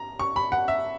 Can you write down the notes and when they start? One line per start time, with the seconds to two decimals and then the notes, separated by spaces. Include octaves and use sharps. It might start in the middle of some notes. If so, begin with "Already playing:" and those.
Already playing: A#5
0.19 C#6
0.36 B5
0.52 F#5
0.68 E5